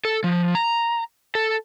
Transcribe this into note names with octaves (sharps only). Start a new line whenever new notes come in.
A4
F3
A#5
A4